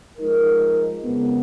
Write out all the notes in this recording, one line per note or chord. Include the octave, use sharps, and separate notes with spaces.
F3 G#3 D#4 A#4
F2 C#3 G#3 B3